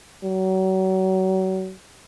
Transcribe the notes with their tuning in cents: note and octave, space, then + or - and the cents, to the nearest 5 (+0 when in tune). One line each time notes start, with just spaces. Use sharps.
F#3 +35